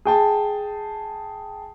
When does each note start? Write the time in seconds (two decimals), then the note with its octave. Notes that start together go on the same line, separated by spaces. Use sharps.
0.05 G#4 G5 A5